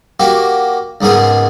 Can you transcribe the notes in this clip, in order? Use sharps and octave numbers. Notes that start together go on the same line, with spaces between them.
A#3 F#4 G4
C#2 G#2 A#3 B3 G#4